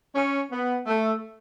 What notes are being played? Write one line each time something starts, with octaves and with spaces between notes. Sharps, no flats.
C#4
B3
A3